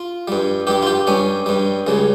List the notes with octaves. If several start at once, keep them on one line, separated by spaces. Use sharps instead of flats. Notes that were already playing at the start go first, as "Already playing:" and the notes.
Already playing: F4
G2 G3
G2 G3 G4
F4
G4
G2 G3 C#4
G2 G3
C#2 C#3 G3